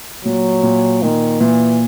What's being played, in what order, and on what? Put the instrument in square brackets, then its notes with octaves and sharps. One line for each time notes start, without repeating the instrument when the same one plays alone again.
[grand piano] A#2 [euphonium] F#3
[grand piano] A#2
[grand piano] A#2 [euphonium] D#3
[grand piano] A#2 [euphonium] E3